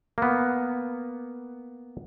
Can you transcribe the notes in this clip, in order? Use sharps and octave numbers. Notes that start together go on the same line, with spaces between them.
A#3 B3